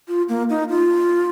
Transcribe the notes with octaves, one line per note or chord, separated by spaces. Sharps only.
F4
A#3
D#4
F4